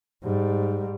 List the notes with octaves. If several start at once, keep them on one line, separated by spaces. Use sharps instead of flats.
G#2 G3